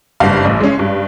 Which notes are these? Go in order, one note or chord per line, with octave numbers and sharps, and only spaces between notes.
F#1 G2 F5
A1
G#3 C#4
G2